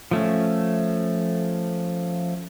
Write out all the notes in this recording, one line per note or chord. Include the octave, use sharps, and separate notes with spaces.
F3 A3 C#4